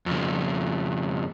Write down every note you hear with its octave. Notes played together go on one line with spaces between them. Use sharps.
F2 C#3